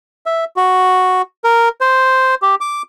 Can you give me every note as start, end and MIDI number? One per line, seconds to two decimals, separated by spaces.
0.26 0.45 76
0.57 1.22 66
1.44 1.69 70
1.81 2.35 72
2.42 2.55 67
2.61 2.82 86